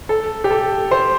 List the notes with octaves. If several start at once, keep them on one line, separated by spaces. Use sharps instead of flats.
A4
G4
A4
C5